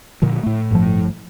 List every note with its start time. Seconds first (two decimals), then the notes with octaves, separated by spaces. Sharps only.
0.22 A#2 D3 F3
0.43 A2 A3
0.71 G1 A#2 F3